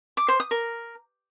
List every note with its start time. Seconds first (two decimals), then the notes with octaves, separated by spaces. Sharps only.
0.17 D6
0.28 C5
0.40 D#6
0.51 A#4